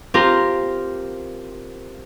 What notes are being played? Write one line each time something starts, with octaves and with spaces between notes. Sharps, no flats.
C4 F4 G4 A#4